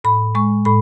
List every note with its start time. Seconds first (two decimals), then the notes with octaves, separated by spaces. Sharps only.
0.04 A2 B5
0.35 G#3 C#6
0.65 A2 B5